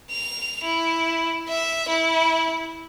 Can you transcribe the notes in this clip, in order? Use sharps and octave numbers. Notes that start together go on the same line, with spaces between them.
F7
E4
E5
E4